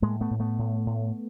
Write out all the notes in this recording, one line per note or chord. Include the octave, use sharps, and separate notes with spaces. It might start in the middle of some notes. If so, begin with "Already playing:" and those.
A2 G#3 A#3
A3 B3
A2
A3 B3
A2
A2